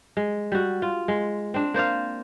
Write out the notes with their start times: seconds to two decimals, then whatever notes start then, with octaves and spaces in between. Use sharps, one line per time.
0.17 G#3
0.52 G3 F#4
0.82 F4
1.08 G#3
1.54 C4 D4
1.74 A#3 C5 D5 F5